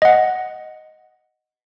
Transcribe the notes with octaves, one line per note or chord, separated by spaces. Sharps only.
D#5 F#5